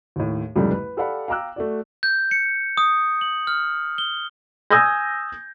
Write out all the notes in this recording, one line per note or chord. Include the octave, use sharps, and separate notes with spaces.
D#2 A2
C2 F2 G#2 C#3 G3 A3
B4
G4 A4 D5 F5 F#5 B5
F5 G5 A#5 D6 E6 F#6
A3 F#4 D5
G6
C#7
D#6
F#7
F6
G7
G#5 D#6 E6 G6 G#6 A#6